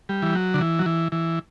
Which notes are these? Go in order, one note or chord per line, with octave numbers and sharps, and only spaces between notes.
G3
E3
F#3
D3
E3
F#3
E3
E3